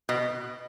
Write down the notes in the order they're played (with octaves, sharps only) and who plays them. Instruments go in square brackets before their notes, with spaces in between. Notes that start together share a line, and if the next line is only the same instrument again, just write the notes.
[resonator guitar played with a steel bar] B2